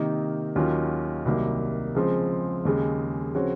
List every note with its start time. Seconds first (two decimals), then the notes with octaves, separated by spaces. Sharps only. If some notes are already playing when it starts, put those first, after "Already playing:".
Already playing: C3 D#3 A#3 D#4 A#4
0.55 D#2 D#3 F#3 C#4 F4
1.25 C2 C3 D#3 F#3 A#3
1.95 C#3 F3 G#3 C4
2.65 D#2 C#3 G#3
3.34 C#3 F3 C4 F#4 C#5